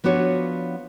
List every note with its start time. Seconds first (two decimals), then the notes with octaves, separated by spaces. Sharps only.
0.04 F3 B3 D4 F#4 C#5